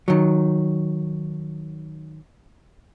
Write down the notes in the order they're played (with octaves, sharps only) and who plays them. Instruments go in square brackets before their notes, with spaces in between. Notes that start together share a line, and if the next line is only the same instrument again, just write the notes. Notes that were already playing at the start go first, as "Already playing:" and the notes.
[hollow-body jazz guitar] D#3 F#3